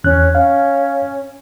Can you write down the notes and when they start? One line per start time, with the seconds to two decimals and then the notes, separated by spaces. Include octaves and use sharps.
0.04 E2 C#4 F#6
0.35 C#4 F5